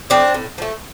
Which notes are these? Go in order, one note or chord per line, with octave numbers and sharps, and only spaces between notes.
F3 A3 C4 D4
A2
F3 A3